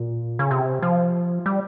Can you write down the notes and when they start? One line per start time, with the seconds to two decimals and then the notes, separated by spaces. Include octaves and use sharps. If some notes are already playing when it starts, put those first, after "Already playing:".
Already playing: A#2
0.39 C#3
0.51 C3
0.82 F3
1.46 G3